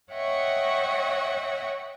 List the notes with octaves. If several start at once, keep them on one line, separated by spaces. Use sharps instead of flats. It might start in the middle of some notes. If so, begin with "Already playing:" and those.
C#5 D#5 E5 F#5 G5 C#6